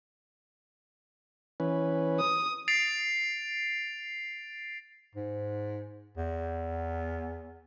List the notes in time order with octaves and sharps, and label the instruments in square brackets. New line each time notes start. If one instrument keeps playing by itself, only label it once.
[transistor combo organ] E3 C#4 B4
[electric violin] D#6
[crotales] A6 C7 D7 F7
[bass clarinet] G#2
E2